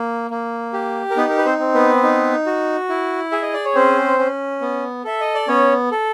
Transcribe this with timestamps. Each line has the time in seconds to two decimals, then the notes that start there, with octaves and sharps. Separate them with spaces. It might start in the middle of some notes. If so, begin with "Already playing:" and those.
Already playing: A#3
0.31 A#3
0.73 G4
1.11 A#4
1.16 B3 D#4 B4
1.29 A#4
1.38 B4
1.45 C4 C5
1.59 C4
1.74 B3 B4
2.03 D#4
2.46 F#4
2.89 E4
3.31 G#4 E5
3.42 D#5
3.54 D5
3.65 C#5
3.75 C4 C#4 C5
4.19 C#4
4.61 B3
5.04 A4 E5
5.21 D#5
5.35 D5
5.48 B3 C#4 C#5
5.91 A4